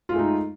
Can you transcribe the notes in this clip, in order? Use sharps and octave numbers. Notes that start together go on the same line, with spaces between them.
G#3 A3 D#4 F4